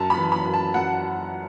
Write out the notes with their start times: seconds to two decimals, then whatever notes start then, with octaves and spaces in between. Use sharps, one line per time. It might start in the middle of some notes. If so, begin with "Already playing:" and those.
Already playing: F#2 A5
0.10 B5
0.17 E3
0.32 B5
0.45 F#2
0.53 A5
0.74 F#2 F#5